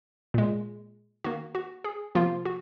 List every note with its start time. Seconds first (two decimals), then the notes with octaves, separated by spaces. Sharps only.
0.34 A#2 G#3
1.24 D#3 A#3 F#4
1.55 F#4
1.84 G#4
2.15 C3 F3 A#3 F4
2.45 F#4